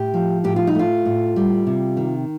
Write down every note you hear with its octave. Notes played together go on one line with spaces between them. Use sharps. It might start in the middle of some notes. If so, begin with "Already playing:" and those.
Already playing: A2 G4
F3
A2 G4
F4
D#4
A3 F4
A2
G3
C3
D#3